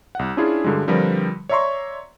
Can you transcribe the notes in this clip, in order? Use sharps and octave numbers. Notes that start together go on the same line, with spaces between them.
C2 F#5
C#4 D4 E4 F4 G#4
G2 D3 F#3 G#3
D3 F3 G3 C4 A#4 B4
C#5 D5 E5 A#5 C6 C#6